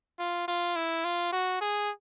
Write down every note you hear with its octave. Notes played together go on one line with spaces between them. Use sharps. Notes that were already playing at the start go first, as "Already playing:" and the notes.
F4
F4
E4
F4
F#4
G#4